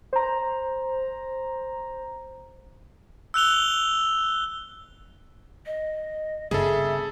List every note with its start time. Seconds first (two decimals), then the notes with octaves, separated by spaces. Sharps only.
0.13 C5 A#5
3.34 E6 F#6 F7 G7
5.66 D#5
6.51 G1 C#3 G#4 A4 E5